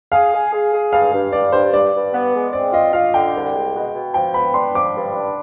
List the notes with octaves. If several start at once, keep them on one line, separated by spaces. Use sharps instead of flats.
G#4 F5
G#4
G#4
G#4
G2 F5
G2
G2 D5
G2 C5
G2 D5
G2
B3
G#3
C4 D5
F4 D#5
F4 F5
D3 G5
C2
G#3
B2
B2
F3 G5
B3 B5
D4 C6
F3 D6
G2
D4